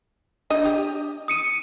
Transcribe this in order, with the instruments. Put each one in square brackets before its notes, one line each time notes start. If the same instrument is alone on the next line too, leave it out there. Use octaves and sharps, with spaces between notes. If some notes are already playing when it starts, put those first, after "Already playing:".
[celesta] D4 [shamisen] D#5
[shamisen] G4
[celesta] D#6 C#7 D#7